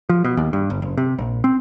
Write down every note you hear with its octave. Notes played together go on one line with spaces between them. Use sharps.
F3
B2
D#2
G2
G1
F#1
C3
A#1
C4